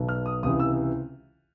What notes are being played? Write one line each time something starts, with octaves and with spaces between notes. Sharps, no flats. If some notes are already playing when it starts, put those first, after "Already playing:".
Already playing: B1 B2
F6
D#6
C#2 C3 E3 D#6
E6